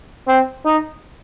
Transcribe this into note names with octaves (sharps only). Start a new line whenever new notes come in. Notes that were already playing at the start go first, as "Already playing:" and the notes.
C4
D#4